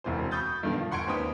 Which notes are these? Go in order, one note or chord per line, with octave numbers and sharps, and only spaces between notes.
E1 D2 C3 E3 C5
B5 C#6 D#6 G6 A6
G2 B2 D3 D#3
F3
E1 F#5 C6 C#6 G#6 D7
D#2 C4 C#4 D#4 B4 D#6